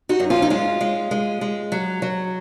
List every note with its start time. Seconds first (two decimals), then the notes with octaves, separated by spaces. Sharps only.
0.09 D#4 F#4
0.20 F#2
0.30 C#4 F4
0.42 D#4
0.50 G#3 C#4 F4
0.81 G#3
1.11 G#3
1.41 G#3
1.72 F#3
2.02 F#3